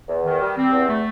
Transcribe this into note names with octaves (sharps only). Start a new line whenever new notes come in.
E2
D#3
G3
C4
E2
A3